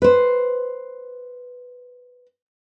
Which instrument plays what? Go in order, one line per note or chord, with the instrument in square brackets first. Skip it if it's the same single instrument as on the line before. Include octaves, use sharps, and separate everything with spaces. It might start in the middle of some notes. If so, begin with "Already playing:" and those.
[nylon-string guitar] B4 C5